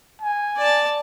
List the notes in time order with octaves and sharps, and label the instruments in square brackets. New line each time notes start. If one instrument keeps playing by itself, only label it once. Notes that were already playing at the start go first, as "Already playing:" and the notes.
[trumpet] G#5
[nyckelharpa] D5 A5